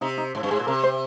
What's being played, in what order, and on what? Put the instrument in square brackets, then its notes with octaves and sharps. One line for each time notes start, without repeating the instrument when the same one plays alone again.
[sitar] C3 [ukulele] D#4
[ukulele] D#4
[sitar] G#2
G2
[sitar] G#2 [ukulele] G#4
[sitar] A#2
[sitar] C3 [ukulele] A#4
[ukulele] C5